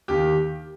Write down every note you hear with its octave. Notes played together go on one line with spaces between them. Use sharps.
D#2 D#3 A#3 G4